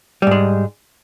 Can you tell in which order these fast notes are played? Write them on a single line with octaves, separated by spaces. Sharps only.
G3 G#2 G#3